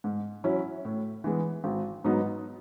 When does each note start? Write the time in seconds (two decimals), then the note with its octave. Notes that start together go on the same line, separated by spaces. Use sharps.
0.04 G#2
0.44 F#3 C#4 E4
0.85 A2
1.24 E3 G#3 B3
1.64 G#1
2.04 G#2 F#3 B3 D#4